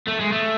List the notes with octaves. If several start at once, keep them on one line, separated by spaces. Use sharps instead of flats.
A3
G#3
A3